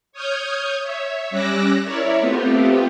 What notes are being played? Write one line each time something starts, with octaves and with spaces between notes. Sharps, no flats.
C#5 D#6 F6 G6 G#6
C#5 E5
G3 C#4 D6 E6 F#6 A#6
E4 A#4 C#5 D5 E5
A3 B3 C4 F4 G4